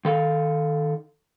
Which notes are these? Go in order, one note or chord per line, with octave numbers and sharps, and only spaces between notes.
D#3 A4 F5